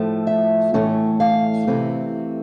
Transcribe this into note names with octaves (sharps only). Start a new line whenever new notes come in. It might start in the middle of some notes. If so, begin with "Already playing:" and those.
Already playing: A2 F3 A3
E5
A2 E3 A3 C#4
F5
C3 E3 A3 C4